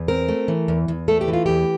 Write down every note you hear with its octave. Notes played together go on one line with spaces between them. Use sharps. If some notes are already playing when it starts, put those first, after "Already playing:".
Already playing: E2
C4 A#4
A3
E3
E2
E2
A3 A4
G4
E3
F4
E2 G4